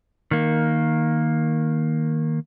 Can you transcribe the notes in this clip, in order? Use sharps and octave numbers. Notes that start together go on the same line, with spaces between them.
D#3 A#3